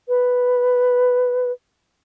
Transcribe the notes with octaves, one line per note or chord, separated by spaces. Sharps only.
B4